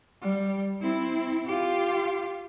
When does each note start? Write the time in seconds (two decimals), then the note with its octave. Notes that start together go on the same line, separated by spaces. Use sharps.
0.22 G3
0.81 C4 E4
1.46 F4 G4